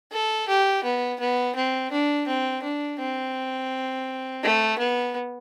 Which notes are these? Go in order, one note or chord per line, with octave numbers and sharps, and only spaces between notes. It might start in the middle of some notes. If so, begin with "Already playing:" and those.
A4
G4
B3
B3
C4
D4
C4
D4
C4
A3
B3